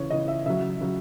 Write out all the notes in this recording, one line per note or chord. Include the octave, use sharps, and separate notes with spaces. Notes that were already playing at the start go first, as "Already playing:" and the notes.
Already playing: C#3 E3 C#5
C#3 E3 D#5
E5
C#3 F#3 E5
C#3 F#3